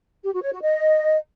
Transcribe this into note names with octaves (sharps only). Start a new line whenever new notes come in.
G4
F#4
C#5
F#4
D#5